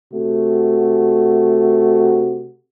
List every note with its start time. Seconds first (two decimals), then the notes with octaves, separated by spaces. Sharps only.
0.13 C3 A3 F#4